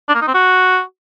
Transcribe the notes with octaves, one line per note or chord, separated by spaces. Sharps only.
D4
A#3
D#4
C4
F#4